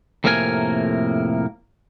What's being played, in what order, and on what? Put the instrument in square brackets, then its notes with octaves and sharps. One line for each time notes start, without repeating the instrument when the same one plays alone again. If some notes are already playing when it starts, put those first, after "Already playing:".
[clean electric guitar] F2 A2 C3 A#3 A#4 G#5